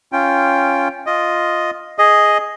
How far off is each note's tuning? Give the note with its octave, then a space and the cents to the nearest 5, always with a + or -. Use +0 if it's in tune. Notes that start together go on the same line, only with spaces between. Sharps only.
C#4 +0 F4 -10 G5 +5
F4 +0 D#5 +0
G#4 +0 D#5 +0